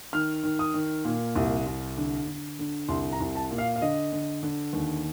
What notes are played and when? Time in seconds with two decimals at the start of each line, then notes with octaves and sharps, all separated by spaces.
0.13 D#3 F6
0.43 D#3
0.59 D#6
0.74 D#3
1.05 A#2
1.36 C2
1.66 C2
1.97 D3
2.27 D3
2.59 D3
2.88 C2 C6
3.12 A#5
3.20 C2
3.35 A5
3.51 A#2
3.58 F5
3.76 F5
3.82 D3 D#5
4.12 D3
4.43 D3
4.73 D#2